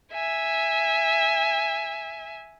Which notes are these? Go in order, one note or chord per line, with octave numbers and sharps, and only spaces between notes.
E5 G#5